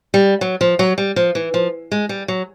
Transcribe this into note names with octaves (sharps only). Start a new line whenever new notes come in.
G3
F#3
F3
F#3
G3
F3
E3
F3
G#3
G3
F#3